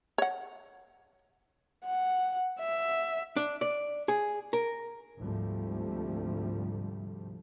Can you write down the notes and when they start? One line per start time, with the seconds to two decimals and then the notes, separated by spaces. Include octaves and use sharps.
0.18 C#5 F#5
1.86 F#5
2.60 E5
3.36 D4
3.61 D5
4.08 G#4
4.53 A#4
5.19 D2 G#2 C3 F3 G3 A3